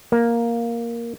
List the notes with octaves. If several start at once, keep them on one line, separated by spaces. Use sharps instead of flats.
A#3